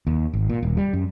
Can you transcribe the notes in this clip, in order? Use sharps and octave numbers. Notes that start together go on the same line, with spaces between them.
D#2
G#1
A#2
D#1
G3
F#2